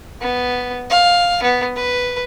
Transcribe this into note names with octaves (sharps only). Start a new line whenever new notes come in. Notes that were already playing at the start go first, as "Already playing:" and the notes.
B3
F5
B3
B4